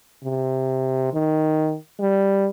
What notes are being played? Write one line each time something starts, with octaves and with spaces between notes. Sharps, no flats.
C3
D#3
G3